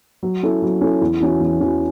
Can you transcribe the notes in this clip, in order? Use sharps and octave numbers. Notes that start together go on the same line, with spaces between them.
F#3
C#4 E4 A4
F#3
C#4 E4 A4
E2
E3 C#4 F#4
E2
E3 C#4 F#4